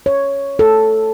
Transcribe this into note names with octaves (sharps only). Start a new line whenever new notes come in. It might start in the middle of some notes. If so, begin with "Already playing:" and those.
C#5
A4